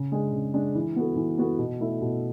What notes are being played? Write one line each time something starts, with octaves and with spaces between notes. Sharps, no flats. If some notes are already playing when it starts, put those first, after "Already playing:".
Already playing: C#3
G#3 D4 G#4
C#3
G#3 D4 G#4
E3
B3 F#4 A4
E3
B3 F#4 A4
B2
A3 E4 A4
B2